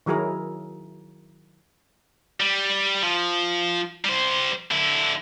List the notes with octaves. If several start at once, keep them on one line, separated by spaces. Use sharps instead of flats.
D#3 F#3 E4 G#4 A#4
G3
F3
G3 C5
D3 E4